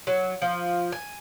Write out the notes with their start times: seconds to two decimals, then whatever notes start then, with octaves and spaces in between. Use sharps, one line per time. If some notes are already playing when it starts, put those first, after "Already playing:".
0.07 F#3
0.42 F3
0.92 G#5